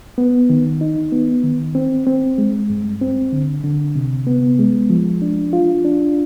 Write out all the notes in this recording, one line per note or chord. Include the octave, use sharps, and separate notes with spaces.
B3
D#3
D#4
B3
D#3
C4
C4
G#3
G2
C4
D3
D3
C3
B3
G#3
F3
D4
F4
D4